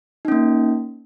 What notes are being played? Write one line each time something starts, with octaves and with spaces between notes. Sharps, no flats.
A#3 C#4 D#4